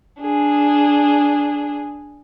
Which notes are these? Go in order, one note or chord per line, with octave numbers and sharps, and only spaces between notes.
D4 G#4